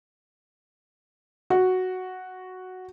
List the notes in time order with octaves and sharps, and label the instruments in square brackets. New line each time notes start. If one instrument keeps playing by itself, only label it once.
[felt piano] F#4